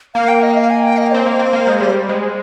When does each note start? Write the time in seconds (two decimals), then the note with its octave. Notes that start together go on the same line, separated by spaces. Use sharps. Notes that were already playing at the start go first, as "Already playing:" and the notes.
0.14 A#3 F5
0.28 G5
0.42 D#5
0.57 F5
0.70 G#5
0.83 G5
0.97 D#5
1.12 C4 C5
1.26 A#3
1.39 C4
1.53 A#3
1.67 G#3
1.80 G3
2.09 G#3